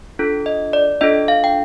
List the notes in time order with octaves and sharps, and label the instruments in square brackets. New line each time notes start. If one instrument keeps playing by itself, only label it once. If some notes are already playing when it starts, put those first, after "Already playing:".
[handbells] D4 F4 A4
D#5
D5
D4 F4 A4 D#5
F5
G5